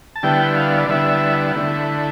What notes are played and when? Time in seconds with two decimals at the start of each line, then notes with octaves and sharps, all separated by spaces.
0.16 A5
0.23 D3 G3 B3 E4 G5
0.56 F5
0.78 D5
0.89 D3 G3 B3 E4 E5
1.55 D3 A3 E4